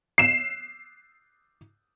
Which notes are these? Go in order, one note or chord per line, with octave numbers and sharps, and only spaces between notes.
C7 E7